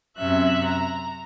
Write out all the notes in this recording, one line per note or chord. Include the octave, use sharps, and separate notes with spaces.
F#2 C3 C#4 E5 F#6
A#5